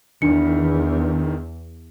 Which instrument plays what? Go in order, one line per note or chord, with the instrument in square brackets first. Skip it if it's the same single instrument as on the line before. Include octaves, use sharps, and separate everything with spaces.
[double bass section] E2 [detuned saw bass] D#3 [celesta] D4 C#7